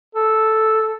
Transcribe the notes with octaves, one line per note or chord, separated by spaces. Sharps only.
A4